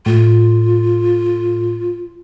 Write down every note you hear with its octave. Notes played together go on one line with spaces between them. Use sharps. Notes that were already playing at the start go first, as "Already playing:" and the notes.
A2 F4